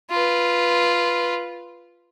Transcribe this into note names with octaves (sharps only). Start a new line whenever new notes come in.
F4 B4